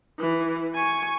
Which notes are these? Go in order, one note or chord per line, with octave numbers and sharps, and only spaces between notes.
E3
G#5 C#6